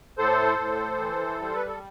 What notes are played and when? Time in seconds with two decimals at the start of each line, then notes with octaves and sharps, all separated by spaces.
0.18 A2 A4 C5
0.58 A2
0.98 E3
1.39 G3 C5
1.55 B4
1.67 A4